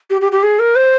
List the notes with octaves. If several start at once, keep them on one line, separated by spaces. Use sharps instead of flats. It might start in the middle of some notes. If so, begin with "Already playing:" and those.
G4
G4
G4
G#4
A#4
C5